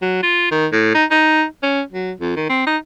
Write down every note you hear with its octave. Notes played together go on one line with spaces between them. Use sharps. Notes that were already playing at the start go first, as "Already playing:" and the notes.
F#3
F4
D#3
A2
D#4
D#4
C#4
F#3
F2
D#3
C4
D#4